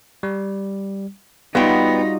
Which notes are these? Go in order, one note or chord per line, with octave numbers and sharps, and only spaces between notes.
G3
G3 B3 D#4 F4 F#4 G5